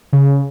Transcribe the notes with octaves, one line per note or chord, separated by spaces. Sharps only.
C#3